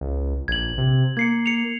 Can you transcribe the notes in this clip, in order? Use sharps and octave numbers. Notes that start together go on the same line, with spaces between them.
C#2
A#1 G#6 F#7
C3
A#3 G#6 C7 C#7
C#7 F7